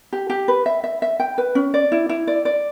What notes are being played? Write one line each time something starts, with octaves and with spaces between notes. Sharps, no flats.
G4
G4
B4
E5
E5
E5
G5
B4
C#4
D5
E4
E4
D5
D5